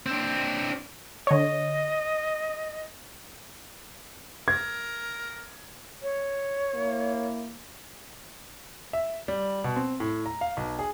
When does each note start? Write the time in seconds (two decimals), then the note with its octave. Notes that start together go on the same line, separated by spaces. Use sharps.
0.06 C4 D4
1.27 D3 C#5 D#5
4.48 A#4 G#6
6.02 C#5
6.72 A#3 E4
8.93 E5
9.28 G3
9.64 B2
9.76 C4
10.00 A2
10.26 A#5
10.41 F5
10.57 B1
10.79 G#4